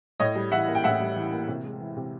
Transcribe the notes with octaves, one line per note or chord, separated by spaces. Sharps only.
A2 C#5 D#5
G3
E3 E5 F#5
A#3
G5
A2 E5 F#5
G3
E3
A#3
C3
G#3
E3
C3